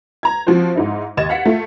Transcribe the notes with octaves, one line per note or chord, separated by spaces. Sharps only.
A#5 G#6
F3 C4 F#4 C5
G#2 D#4 E4
D#2 D#5 G#6 A6 E7
F5 F#5 B6 C#7
A3 F4